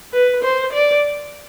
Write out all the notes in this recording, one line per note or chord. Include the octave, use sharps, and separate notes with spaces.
B4
C5
D5